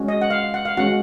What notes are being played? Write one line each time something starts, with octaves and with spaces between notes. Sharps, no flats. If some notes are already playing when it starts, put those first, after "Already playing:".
Already playing: G#3 C#4 F#4
D#5
F#5
F5
F#5
F5
G#3 C#4 F#4 F#5